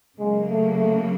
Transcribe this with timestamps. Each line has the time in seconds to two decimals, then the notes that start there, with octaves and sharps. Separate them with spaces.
0.19 C#3 F#3 G#3 A#3
0.48 A3
0.75 A3